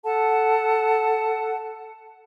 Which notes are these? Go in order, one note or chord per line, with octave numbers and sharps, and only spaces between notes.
A4 F#5 A5